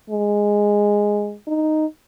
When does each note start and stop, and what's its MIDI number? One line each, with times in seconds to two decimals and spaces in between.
0.10 1.36 56
1.47 1.86 63